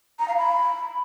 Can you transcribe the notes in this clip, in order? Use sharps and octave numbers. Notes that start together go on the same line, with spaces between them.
A#5
F5
B5